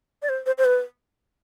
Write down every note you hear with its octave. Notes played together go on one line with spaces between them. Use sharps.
D5
C5
C5
C5
B4